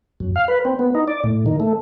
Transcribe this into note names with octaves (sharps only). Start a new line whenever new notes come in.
F#2
F5
B4
C4
B3
D#4
D5
A2
D#3
A3